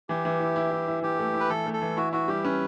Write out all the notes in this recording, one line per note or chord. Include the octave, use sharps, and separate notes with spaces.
E3 G4
E3
E4
E4
E4
E4
E3 G4
A3
E4
B4
E3 A4
A3
A4
E3
E4 F#4
E4 F#4
G3 G4
C#4 B4